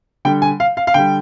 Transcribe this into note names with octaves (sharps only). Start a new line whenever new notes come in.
D3 G3 G5
G#5
F5
F5
F5
D3 G3 G5